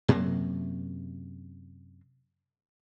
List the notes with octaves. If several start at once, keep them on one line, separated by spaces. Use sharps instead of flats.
F#2 C3 F#3 A#3